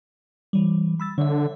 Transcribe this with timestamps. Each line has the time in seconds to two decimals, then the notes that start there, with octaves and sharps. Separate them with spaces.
0.53 E3 G3
1.00 B5 E6 A6
1.18 D3 C#5 E5